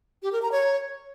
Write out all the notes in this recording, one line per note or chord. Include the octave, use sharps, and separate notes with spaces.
G4
A#4
A#5
C#5